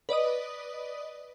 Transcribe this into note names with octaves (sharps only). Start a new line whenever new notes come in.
B4 D5 D#5 D#6